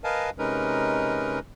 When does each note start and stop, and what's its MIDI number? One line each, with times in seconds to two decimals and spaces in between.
0.04 0.30 70
0.04 0.30 71
0.04 0.30 75
0.04 0.30 77
0.04 0.30 80
0.04 0.30 81
0.39 1.39 48
0.39 1.39 56
0.39 1.39 61
0.39 1.39 63
0.39 1.39 70
0.39 1.39 71